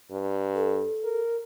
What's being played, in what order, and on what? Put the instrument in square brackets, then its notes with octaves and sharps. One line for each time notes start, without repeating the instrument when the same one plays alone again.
[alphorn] G2
[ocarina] A4
[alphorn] A#4